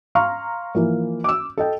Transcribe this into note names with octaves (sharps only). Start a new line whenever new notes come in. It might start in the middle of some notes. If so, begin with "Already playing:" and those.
F5 A#5 C6 C#6 F6
E3 F3 A#3
D6 E6
A4 D#5 G5